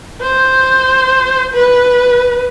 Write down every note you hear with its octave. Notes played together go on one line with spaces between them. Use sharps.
C5
B4